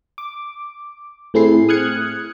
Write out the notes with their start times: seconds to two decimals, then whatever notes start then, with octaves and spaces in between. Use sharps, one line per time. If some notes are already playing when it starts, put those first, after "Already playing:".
0.18 D6
1.34 A2 A3 C4 E4 G#4 C7
1.69 D#6 F6 F#6 G#6 C#7